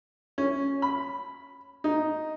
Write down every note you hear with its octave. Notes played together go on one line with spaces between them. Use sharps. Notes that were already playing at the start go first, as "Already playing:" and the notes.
C#4
B5
D#4